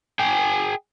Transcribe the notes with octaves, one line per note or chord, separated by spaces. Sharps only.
G#4 G5